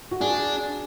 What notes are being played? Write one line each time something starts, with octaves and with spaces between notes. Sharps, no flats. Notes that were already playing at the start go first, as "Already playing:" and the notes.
F#4
D4 G#4